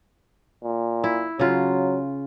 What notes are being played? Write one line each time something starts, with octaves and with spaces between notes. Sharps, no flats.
A#2
E4
C#3 F#3 F4